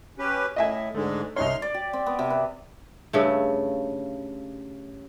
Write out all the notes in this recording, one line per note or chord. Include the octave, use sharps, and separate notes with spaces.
C#4 G4 B4
A2 D#5 E5 G#5
G#2 D3 G#3 A3
C2 D#4 C#5 C6 F6
D5
G4
C4
B3
C3
B4
G2 C#3 A3